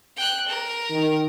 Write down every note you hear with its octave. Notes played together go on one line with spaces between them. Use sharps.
G5 F#6
A#4
D#3